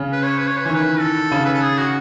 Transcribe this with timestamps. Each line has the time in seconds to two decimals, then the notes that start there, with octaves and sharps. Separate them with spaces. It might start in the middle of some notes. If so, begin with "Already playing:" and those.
Already playing: C#3
0.12 B4
0.23 C#5
0.38 B4
0.47 C#5
0.57 B4
0.65 D#3 E3 C#5
0.75 B4
1.00 A4
1.32 C#3
1.45 B4
1.54 A4
1.62 G#4
1.78 F#4